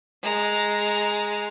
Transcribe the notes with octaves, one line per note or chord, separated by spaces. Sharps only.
G#3 A#5